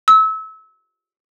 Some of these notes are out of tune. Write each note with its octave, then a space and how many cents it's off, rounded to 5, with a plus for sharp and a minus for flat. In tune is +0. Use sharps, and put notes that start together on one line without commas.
E6 -30